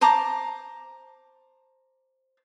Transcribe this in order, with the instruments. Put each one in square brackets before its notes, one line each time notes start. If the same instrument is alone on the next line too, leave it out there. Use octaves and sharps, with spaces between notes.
[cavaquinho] C5 A5 A#5 D6